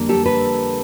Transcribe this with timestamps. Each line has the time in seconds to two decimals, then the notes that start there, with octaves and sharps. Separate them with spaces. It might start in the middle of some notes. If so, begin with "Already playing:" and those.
Already playing: F2 D3 G3 A#3
0.09 G4 A4
0.25 A4 B4